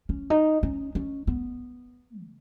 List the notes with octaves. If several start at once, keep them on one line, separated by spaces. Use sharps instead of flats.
C#4
D#4
C#4
C#4
B3
C#3